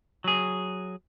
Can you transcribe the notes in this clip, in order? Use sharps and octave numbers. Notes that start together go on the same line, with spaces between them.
F#3 G#4